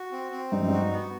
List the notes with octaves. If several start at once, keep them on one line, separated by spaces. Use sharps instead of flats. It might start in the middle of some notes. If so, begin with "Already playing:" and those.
Already playing: F#4
C4
C4
G2 D#4
F#2
G2 F#4
B3